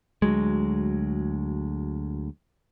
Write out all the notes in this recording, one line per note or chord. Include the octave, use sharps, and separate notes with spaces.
D2 F#3 G#3